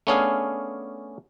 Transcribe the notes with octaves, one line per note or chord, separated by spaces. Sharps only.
A3 B3 C#4 D4 G#4 F5